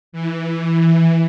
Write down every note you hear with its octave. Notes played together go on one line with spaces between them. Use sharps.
E3